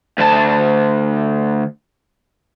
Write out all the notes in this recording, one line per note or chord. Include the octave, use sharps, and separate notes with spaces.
D2 A5